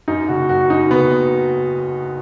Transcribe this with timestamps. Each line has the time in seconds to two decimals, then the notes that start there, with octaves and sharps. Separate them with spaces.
0.08 F#2 D#4
0.28 F#1 F#4
0.49 F#2 F#4
0.70 F#2 D#4
0.91 F#1 B3